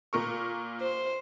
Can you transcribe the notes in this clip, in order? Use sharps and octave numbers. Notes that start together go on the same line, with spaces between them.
A#2 A#4 C#6
C5